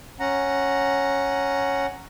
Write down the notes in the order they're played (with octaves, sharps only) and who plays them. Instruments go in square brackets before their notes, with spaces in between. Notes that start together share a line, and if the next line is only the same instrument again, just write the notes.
[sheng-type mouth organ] C#4 F#5 A#5